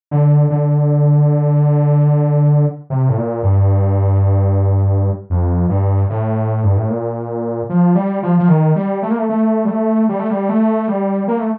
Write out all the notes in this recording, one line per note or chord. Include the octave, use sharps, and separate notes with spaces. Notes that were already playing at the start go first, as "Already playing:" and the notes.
D3
D3
C3
A2
A#2
G2
F2
G2
A2
G2
A2
A#2
F3
G3
F3
F3
D#3
G3
A3
A#3
A3
A3
G3
A3
G3
A3
G3
A3
G3
A#3
A3